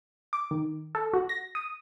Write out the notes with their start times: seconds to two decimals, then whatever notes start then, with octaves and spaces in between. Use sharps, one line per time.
0.33 D6
0.51 D#3
0.95 A4
1.13 F#4
1.29 A#6
1.55 D#6